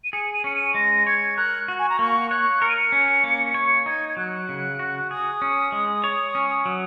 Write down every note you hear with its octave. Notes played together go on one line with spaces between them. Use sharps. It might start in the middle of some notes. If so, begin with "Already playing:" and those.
D#7
G#4 C#7
D#7
C#4 C#7
D#7
G#3 A#6
C#5 G#6
A#4 F#6
F#4
G#5
A#5
A#3 C#6
C#5 F#6
A#4 C#7
D#7
C#7
C#4
A#3
C#5
D#4 G#6
G#6
F#3 F#6
C#3
F#4
G#4 D#6
C#4
G#3
C#5
C#4
F#3